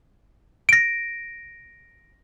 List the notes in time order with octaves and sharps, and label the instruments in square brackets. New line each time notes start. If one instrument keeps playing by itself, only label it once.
[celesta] A#6 D7